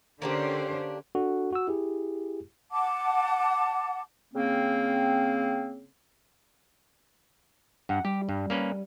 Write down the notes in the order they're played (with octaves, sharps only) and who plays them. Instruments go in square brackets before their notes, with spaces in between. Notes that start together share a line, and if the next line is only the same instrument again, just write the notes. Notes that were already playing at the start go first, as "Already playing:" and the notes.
[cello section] D3 C#4 C5 [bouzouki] A#3 D4 G4
[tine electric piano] D4 F#4 A4
F#4 E6
E4 G4 G#4
[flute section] F#5 A5 D6
[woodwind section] C#3 A#3 C4
[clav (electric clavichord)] G2 [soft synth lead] F#5
[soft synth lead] G3 [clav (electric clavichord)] G4
[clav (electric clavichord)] G2
A#3 C#4 B4